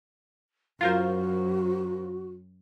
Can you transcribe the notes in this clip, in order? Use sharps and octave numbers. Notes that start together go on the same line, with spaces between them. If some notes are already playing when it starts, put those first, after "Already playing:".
F#2 F4 F#4 A#4 C5